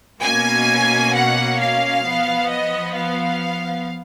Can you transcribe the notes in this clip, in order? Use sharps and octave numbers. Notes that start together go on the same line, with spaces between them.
B2 A#3 C#4 G#5
F#5
F5
F3 B3
D#5
F5